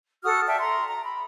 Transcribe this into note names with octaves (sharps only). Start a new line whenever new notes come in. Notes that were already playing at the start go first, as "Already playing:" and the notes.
F#4 A4 D#6 F6
D5 E5 G5 A5
A#5 C6
A#5
B5